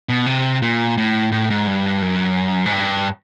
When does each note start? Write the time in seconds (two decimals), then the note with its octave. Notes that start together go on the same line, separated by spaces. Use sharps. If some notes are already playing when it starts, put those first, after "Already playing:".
0.09 B2
0.26 C3
0.62 A#2
0.97 A2
1.32 A2
1.50 G#2
1.67 G2
2.02 F#2
2.66 G#2
2.72 G2